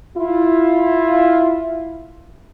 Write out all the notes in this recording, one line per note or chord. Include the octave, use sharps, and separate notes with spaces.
E4 F4